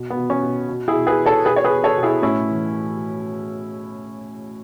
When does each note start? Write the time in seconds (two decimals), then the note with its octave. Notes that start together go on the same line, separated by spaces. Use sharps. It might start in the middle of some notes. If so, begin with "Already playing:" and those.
Already playing: B2
0.10 B3
0.17 B2
0.30 C#4
0.42 B2
0.69 B2
0.88 E4 G#4
0.94 B2
1.07 G#4 B4
1.20 B2
1.26 A4 C#5
1.45 B2 G#4 B4
1.56 C#5
1.64 G#4 B4
1.71 B2
1.84 A4 C#5
1.98 B2
2.03 E4 G#4
2.22 A2 C#4 E4
2.48 E3